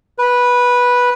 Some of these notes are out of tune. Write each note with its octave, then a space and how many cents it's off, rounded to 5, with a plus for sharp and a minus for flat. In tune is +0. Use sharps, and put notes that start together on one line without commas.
B4 -10